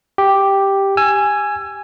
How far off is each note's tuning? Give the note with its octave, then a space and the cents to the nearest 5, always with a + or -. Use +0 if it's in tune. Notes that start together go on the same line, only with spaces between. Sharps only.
G4 +0 G5 +0
G#5 +0 E6 +30